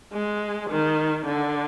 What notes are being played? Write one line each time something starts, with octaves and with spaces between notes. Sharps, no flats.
G#3
D#3
D3